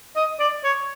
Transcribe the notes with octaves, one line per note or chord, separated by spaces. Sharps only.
D#5
D5
C#5